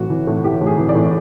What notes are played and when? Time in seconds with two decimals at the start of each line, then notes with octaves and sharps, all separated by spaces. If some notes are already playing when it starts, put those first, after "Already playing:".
Already playing: A2 E3 F#4
0.10 E3
0.27 A2
0.44 E3 G4
0.61 A2
0.67 G#4
0.78 E3
0.89 D5
0.95 A2